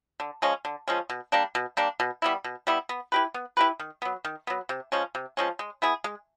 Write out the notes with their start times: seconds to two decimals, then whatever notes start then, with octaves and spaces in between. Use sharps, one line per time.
0.20 D3
0.42 F3 G#3 C#4
0.65 D3
0.88 F3 G#3 C#4
1.10 B2
1.32 G3 A#3 D4
1.55 B2
1.77 G3 A#3 D4
2.00 B2
2.22 G3 B3 E4
2.44 B2
2.67 G3 B3 E4
2.89 B3
3.12 E4 G4 B4
3.34 B3
3.57 E4 G4 B4
3.79 D#3
4.02 F#3 B3
4.25 D#3
4.47 F#3 B3
4.69 C3
4.92 F3 G#3 C#4
5.15 C3
5.37 F3 G#3 C#4
5.59 G#3
5.82 B3 E4 G#4
6.04 G#3